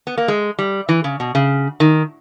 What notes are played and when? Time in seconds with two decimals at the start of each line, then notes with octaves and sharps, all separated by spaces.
0.07 B3
0.18 A#3
0.28 G#3
0.59 G3
0.89 E3
1.04 C#3
1.20 B2
1.35 C#3
1.80 D#3